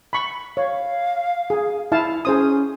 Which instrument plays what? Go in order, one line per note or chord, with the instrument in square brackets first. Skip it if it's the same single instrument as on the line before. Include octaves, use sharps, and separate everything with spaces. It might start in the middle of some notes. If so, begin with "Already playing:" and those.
[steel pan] B5 C#6
[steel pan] C#5 [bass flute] F5
[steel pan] G#4
E4 F5 A5
[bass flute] C#4 [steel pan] G#4 C5 D#6